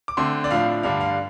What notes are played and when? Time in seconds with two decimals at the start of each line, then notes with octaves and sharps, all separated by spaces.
0.08 D6
0.17 D3 A3 C4 C6
0.44 D5
0.51 A2 F3 D4 F5
0.83 G2 D3 G3 D4 F5
1.00 F5